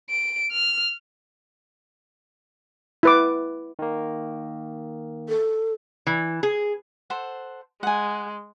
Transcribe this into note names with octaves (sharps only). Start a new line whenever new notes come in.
D7
F6
E4 B4 D6
D#3 A#3
A4
E3
G#4
A4 C5 F#5
G#3 F#5 G#5